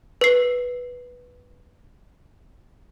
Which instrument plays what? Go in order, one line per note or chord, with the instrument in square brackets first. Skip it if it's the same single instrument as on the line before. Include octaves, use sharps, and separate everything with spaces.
[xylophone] B4 C7